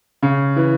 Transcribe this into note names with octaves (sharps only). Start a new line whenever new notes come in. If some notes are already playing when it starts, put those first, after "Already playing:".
C#3
E3